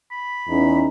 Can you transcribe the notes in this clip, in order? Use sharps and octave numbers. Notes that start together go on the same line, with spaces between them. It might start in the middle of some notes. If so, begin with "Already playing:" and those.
B5
E2 C#4 D#4